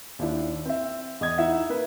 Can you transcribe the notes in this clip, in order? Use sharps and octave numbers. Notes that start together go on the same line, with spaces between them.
D#2 D4 E4
C4 E5
E2 D#5 D#6 G#6
D#4 E4 E5 F#5
A#3 B4